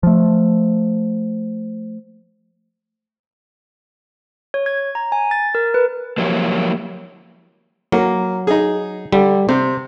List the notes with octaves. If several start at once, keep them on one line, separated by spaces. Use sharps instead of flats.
F3 A3
C#5
G#6
A#5
G#5
A6
A#4
B4
F3 F#3 A#3 E4 G4 C#5
F#3 A#3
D#4 G#4
D3 G3
C3 C5